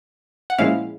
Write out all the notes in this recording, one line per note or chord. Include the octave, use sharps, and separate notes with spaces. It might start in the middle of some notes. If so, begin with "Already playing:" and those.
F#5
A#2 F3 G#3 C#4 E4 F5